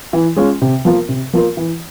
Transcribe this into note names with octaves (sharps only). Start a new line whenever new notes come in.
E3
G#3 C#4 F4
C3
F3 A#3 F4 A#4
C3
F3 A#3 F4 A#4
E3